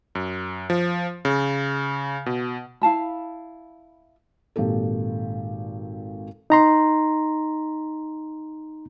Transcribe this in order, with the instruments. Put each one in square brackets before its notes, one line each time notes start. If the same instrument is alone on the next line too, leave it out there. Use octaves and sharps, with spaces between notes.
[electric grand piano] F#2
F3
C#3
B2
[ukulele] E4 F5 A5 B5
[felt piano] G#1 A#2 G4 A4
[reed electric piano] D#4 A#5 C6